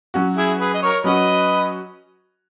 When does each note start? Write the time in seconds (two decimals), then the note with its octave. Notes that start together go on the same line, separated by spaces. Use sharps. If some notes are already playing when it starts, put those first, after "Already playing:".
0.14 F#3 C#4 F#4
0.36 E4 G#4
0.59 G#4 B4
0.74 D#5
0.82 A#4 C#5
1.04 F#3 C#4 F#4 B4 D#5